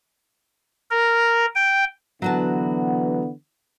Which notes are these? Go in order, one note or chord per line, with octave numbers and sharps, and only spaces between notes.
A#4
G5
D3 E3 F#3 B3 F#4 A5